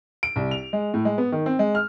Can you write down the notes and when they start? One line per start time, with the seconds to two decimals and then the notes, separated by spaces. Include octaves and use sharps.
0.23 D7
0.36 C2
0.51 F7
0.73 G#3
0.94 A2
1.05 G#3
1.18 B3
1.32 D#3
1.46 C4
1.59 G#3
1.75 F6